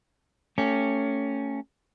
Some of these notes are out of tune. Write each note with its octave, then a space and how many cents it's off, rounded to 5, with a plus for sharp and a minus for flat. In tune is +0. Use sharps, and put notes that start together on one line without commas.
A3 +25 C#4 +0 G4 -5